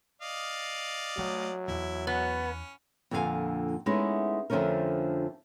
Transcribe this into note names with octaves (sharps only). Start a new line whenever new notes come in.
D5 D#5 F5
F#3 A3
E2 E4
B3 C#4
F2 A#2 D3 D4 F5 G#5
G#3 A3 B3 C#4 D#4 E4
F2 D3 F3 A3 C#4 A#4